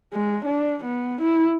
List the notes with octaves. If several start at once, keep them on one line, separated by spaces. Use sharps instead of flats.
G#3
D4
B3
E4